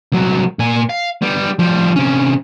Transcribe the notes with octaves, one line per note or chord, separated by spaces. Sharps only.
C2 F#3
A#2 G#5
F5
G3 B3
F3 G3
C3 C#4